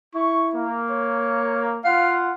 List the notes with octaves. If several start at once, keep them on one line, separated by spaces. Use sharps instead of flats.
E4 C#6
A#3
C#5
F4 F5 F#5